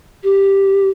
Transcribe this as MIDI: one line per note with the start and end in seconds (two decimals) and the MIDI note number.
0.24 0.89 67